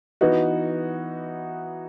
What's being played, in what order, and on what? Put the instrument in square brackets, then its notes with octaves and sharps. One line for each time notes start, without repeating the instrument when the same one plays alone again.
[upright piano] E3 B3 D#4 F#4